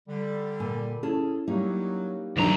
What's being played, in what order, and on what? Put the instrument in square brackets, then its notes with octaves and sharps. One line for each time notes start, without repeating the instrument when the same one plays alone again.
[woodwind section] D3 G3
[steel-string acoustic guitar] A#2 G#5
[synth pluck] C#4 E4 [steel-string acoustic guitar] G#4 A4
[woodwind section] F#3 [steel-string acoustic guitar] G3 A#3 D#4
[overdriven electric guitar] D2 A#5 [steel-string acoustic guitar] E3 F#3 D5 [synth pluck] D4 D#4